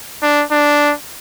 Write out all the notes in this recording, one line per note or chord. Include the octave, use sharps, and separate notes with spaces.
D4
D4